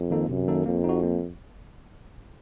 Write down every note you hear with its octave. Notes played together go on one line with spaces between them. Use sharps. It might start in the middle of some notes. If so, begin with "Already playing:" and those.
Already playing: F2
D#3 A#3 D#4 A4
F#2 C3
D#3 A#3 D#4 A4
F2 A#3
D#4
F#4
A#3